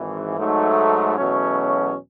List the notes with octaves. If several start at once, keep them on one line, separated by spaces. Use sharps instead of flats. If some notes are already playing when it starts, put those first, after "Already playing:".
Already playing: G#1 G#2 E3
G#2 F#3 A3 D#4
E2 B2 F#3 A3 C#4